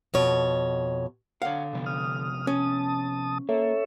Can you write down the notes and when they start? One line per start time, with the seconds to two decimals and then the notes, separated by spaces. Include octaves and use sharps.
0.14 F2 B2 C#5
1.42 D3 C#5 F5 F#5
1.73 C3 F3 B3
1.86 D#6 F6
2.47 C#4 A5 D#6
3.49 A#3 A4 C#5 E5